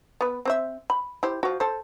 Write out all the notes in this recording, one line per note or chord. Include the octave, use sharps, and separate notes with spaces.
B3 B4
C4 C5 E5
B5
E4 G4 C5
F3 F#4
A4 C5